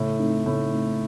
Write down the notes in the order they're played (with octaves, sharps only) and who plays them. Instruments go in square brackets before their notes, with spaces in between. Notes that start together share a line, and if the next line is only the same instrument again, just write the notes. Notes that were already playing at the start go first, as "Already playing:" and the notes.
Already playing: [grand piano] A2 [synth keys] C#3
[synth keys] A3 C4 D#4
[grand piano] A2 [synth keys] C#3
[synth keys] A3 C4 D#4